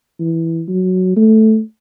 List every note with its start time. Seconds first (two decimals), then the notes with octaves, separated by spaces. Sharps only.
0.19 E3
0.68 F#3
1.16 A3